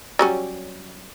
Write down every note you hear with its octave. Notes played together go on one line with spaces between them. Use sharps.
F#3 G3 C#4